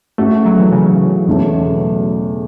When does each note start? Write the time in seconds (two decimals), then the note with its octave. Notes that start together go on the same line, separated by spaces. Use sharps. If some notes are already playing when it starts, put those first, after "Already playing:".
0.18 G#2 G#3 A3 C#4 F#4
0.32 A3
0.46 F#3
0.59 E3
0.72 C#3
1.27 E2 B2 A3 C#4